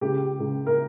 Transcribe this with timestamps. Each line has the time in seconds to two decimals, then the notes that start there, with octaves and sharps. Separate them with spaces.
0.01 C#2 G4
0.40 C#2
0.67 A#4